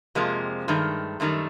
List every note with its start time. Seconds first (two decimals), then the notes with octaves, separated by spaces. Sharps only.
0.15 F2 C3 F3 G#3 A#3
0.68 G2 D#3 G#3 A3
1.20 F#2 D#3 G3 A3